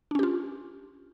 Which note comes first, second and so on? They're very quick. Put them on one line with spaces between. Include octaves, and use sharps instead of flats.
D4 C#4 G4 F4